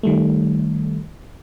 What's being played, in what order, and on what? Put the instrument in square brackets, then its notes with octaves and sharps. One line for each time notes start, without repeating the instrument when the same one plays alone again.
[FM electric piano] D#3 G3 A3